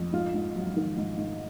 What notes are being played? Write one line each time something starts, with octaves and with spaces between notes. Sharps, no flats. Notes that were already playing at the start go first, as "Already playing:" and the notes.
Already playing: F2
G#2 F4
G#2
F#3
D#3
G#2
G#2